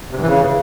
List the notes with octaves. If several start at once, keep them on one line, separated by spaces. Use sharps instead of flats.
C3
G2
E3
C#3